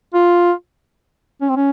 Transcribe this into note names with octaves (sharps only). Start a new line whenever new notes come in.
F4
C#4
C4
C#4